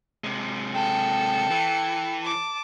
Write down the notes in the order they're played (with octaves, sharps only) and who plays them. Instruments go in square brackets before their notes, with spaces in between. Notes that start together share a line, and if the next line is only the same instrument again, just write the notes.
[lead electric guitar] C3 G#3
[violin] A4 C#7 [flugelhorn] G5
[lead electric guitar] E3
[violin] A5 D6